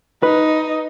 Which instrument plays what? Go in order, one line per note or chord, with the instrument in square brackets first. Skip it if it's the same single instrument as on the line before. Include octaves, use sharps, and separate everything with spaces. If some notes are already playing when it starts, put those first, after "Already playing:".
[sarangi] D#4 [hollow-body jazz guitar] B4